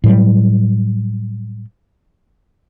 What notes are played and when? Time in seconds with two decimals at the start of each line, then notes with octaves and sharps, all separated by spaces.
0.04 A2 F#3 G3